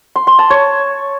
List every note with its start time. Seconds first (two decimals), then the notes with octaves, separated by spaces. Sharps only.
0.16 C6
0.27 C6
0.39 A5
0.50 C#5